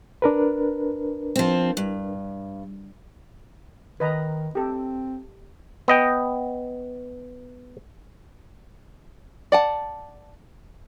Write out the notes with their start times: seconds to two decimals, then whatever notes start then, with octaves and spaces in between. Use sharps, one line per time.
0.22 D4 A#4 B4
1.36 F3 C4
1.77 G2
4.00 D#3 B4 D#5 A#5
4.55 C4 G4 A4
5.88 B3 D#5 G5
9.52 D5 F#5 A5